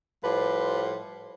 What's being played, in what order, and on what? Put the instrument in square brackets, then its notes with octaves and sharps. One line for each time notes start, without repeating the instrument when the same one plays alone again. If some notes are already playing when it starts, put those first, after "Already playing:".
[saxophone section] A2 F3 G3 G4 B4 C5